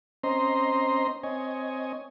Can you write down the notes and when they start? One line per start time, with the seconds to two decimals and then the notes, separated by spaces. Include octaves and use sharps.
0.24 C4 C#4 C5 D#5 A#5 C6
1.23 C4 C#5 D#5 G#5